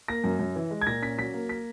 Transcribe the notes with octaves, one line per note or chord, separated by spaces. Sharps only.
A#3 A#6
F#2
F#2
E3
G#3
G#6
A#2 A#6
C#4 B6
F#3 B6
A#3
B6